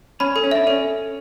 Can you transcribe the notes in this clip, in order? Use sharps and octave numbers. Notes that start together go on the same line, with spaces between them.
C#4 B5
A4
C#4
D4 E5
C#4 A4